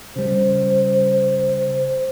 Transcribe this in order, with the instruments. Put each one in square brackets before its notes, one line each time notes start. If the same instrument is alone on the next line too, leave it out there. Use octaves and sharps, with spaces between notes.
[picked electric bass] C#3 G3 [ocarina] C5